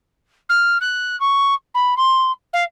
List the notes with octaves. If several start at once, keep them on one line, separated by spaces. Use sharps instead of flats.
F6
F#6
C#6
B5
C6
F5